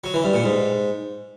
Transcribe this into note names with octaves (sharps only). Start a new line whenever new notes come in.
F#3
E3
G2
A#2
G#2